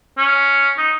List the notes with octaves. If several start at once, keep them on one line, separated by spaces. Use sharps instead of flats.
C#4
D#4